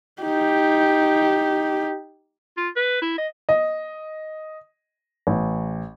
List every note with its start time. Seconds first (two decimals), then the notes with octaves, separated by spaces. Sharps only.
0.22 D#4 G4
2.57 F4
2.76 B4
3.02 E4
3.18 D#5
3.49 D#5
5.27 A1